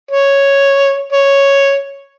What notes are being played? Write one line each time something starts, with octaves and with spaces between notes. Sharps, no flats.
C#5
C#5